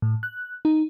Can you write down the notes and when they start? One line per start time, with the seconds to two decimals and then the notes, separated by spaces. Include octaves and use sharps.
0.02 A2
0.23 F#6
0.65 D#4